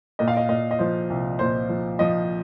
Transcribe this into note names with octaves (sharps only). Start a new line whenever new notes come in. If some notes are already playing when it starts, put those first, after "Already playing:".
A#2 D#5
F5
D#5
A#2 D#5
D#5
F3 C5
C2
A#2 C5
F3
F3 D#5